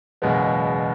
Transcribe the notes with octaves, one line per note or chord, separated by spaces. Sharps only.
F#1 E2 B2 G#3 B3